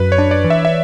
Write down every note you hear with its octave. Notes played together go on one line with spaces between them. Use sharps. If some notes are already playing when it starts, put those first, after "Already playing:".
Already playing: F#2 B4
C#5
D4
D5
E3
E5
E5